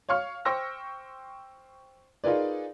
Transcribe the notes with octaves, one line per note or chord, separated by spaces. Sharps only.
C#5 F5 C#6 F6
C5 G5 C#6 E6 A#6
D#4 F4 G#4 A#4 B4 D5